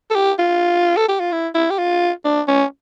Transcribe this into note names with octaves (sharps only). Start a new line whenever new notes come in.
A4
G4
F4
A4
G4
F4
E4
E4
G4
F4
D4
C#4